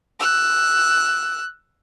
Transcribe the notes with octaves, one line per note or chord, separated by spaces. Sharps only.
E6 F#6